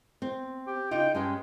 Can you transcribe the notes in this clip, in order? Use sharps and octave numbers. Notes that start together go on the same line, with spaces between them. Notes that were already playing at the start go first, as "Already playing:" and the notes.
C4
G4
C#3 D#4 F4 G5
G2 G#3 C#4 G5